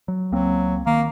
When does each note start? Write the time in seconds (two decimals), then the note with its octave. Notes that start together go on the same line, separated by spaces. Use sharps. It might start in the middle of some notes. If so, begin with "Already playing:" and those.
0.08 F#3
0.32 C#2 F#3 A#3 C4
0.86 D#3 A#3